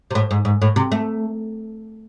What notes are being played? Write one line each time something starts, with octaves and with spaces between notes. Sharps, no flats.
C3
A2
G#2
G#2
A2
C3
A3